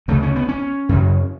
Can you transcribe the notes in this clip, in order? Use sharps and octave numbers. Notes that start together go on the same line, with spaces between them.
D2 C#3 A3
C#4
B3
C#4
F#2 C#3